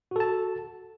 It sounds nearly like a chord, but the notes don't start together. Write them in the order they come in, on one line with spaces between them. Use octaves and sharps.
F#4 A4 A5